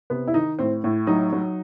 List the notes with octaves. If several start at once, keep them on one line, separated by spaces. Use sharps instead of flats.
C3 B3
E4
D#3 D#4
A2 C4
A2
F#3 D#4
F#3